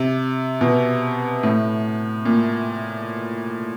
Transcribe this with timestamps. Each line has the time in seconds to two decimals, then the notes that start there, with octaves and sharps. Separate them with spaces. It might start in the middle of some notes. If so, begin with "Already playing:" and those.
Already playing: C3
0.61 B2
1.43 A2
2.25 A#2